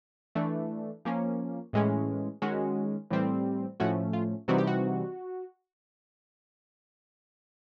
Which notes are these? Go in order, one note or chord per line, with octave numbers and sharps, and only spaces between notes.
E3 A3 D4
F3 A#3 C#4
A2 E3 G#3 C#4
D#3 G#3 C#4 F#4
A2 E3 G3 C4
A2 F3 A3 C#4 F#4
F4
C3 E3 G3 C4 D#4 F#4
G4
F#4